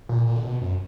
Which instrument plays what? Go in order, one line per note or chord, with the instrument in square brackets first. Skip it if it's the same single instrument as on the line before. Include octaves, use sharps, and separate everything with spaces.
[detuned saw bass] A#2
A#2
D3
B2
F#2